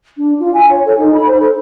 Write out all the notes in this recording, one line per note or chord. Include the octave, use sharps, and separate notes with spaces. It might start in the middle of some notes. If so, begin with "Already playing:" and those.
D4
F4
G#5
C#5
A4
D#4
B5
C5
A4